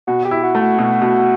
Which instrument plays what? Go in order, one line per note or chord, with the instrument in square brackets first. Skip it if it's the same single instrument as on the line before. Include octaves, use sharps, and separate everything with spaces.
[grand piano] B2 [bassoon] F#4
[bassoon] G4
[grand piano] E4
[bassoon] F#4
[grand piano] A3
[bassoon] F#4
[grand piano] B2
B2